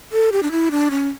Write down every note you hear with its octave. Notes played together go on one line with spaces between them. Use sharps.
A4
G4
D4
E4
D4
C#4